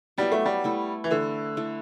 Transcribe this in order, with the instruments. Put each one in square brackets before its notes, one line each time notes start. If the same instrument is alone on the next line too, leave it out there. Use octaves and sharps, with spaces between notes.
[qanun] F#3 B3 E4 G4 [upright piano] G3
[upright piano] A3
G3
[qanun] A3 E4 A4
[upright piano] E3
[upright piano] D3 [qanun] A3 E4 A4
[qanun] A3 E4 A4